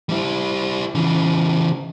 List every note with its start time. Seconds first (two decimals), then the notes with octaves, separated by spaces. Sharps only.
0.09 G3 E4
0.95 C#3 E3